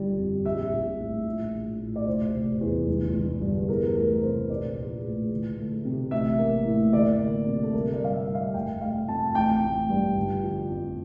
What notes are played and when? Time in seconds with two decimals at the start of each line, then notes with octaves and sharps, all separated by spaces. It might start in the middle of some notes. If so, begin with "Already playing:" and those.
Already playing: G1 G3
0.19 F2
0.45 A#1 E5
0.72 A#1
1.00 A2
1.26 A#1
1.53 A#1
1.80 A2
1.96 D5
2.07 F1 C5
2.34 F1
2.61 E2
2.88 G1
3.14 G1
3.42 G2
3.69 E2 A#4
3.96 A3 A#4
4.22 C3 C5
4.50 A#1 D5
4.76 A#1
5.04 A2
5.31 D2
5.58 A3
5.85 C3
6.11 A1 E5
6.39 A#3
6.65 A2
6.93 D2 D5
7.19 A#3
7.47 C3
7.63 A4
7.74 G1 A#4
7.93 D5
8.01 G3 F5
8.14 E5
8.28 G2
8.35 F5
8.54 F1 G5
8.81 A3 F5
9.08 F2 A5
9.35 A1 G5
9.62 A1
9.89 G2
10.16 G1
10.43 F3
10.70 F2